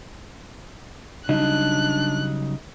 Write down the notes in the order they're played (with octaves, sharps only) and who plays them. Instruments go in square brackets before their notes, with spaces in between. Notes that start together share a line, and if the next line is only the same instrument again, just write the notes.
[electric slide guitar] C#3 F#3 G3 [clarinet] D4 [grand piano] D#4 [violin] F#6